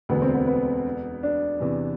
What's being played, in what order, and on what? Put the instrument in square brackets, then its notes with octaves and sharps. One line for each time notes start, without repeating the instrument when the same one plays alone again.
[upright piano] E1 D2 D3 [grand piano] B3
[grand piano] C4
B3
B3
D4
[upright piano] E2 C3 E3